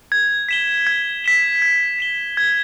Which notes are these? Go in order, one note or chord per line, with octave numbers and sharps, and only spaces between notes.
G#6
B6 E7 G7
G#6
B6 E7 G7
G#6
B6 E7 G7
G#6